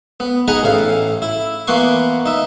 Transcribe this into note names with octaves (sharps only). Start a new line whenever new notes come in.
B3
D#4 G#4 D#5 F#5 A#5 B5
A1 A2 F5
E4
E3 A#3 B3 F#5 C6 C#6
D#4 E5